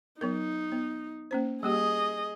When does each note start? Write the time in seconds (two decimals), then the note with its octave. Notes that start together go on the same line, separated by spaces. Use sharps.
0.21 F#3 B3 D#4 A#4
0.72 B3
1.31 A#3 C#4 C5
1.63 G3 A#3 G4 G#4 D#5